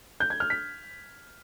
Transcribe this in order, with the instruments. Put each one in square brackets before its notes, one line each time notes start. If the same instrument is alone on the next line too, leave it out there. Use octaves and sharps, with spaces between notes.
[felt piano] G6
G#6
F6
B6